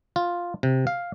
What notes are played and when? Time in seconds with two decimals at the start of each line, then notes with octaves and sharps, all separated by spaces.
0.16 F4
0.63 C3
0.87 F5